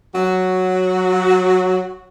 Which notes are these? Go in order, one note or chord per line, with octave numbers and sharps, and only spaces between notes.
F#3 F#4